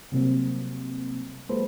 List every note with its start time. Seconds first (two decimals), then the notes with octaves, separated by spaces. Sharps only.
0.12 C3 F#3 G3 A#3 C4
1.49 F#3 G#3 A#3 A4 B4 C5